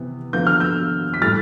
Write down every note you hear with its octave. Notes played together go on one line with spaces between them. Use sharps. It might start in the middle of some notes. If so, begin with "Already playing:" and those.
Already playing: C3 E3 B3
D3 F3 B3 F4 G6
F6
E6 G6
B6
A2 E3 G3 F6 A6